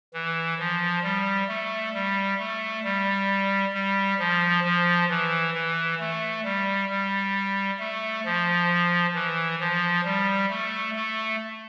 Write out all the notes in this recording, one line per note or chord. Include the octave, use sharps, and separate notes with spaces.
E3
F3
G3
A3
G3
A3
G3
G3
F3
F3
E3
E3
A3
G3
G3
A3
F3
E3
F3
G3
A3
A3